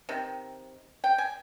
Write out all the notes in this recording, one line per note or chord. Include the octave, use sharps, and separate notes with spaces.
C3 D#3
G5
G#5